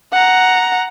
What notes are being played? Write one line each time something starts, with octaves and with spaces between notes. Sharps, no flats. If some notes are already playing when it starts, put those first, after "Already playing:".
F#5 A#5